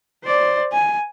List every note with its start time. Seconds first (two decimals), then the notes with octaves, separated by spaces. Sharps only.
0.24 C5 D5
0.72 G#5